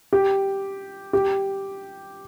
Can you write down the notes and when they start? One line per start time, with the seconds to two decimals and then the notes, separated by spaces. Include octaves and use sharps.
0.13 G4
1.13 G4